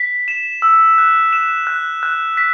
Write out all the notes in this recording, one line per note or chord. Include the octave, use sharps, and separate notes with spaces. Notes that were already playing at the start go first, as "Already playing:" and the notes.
Already playing: B6
E7
E6
F#6
E7
F#6
F#6
B6